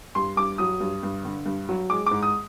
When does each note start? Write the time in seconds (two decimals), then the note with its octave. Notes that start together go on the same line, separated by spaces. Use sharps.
0.15 G2 C6
0.37 G2 D6
0.58 F#3 D#6
0.80 G2
1.03 G2
1.25 D3
1.46 G2
1.69 F#3
1.90 G#3 D6
2.06 G#2 D6
2.23 D#6